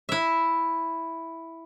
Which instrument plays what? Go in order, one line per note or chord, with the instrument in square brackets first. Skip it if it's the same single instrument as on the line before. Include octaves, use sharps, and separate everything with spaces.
[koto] E4 E5